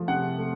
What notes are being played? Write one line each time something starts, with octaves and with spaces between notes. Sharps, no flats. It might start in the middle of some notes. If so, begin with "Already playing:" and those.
Already playing: F3 A3
C3 F#5
A3